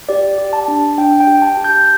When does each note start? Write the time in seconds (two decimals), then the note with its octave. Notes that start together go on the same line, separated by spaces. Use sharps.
0.09 G4 D5
0.38 G4
0.53 A5
0.68 D4
0.98 D4 G5
1.20 G5
1.27 G4
1.42 A5
1.57 G4
1.64 G6